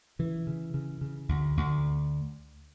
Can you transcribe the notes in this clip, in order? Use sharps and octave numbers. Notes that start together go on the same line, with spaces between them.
C#3 E3
C#3
C#3
C#3
D2
D2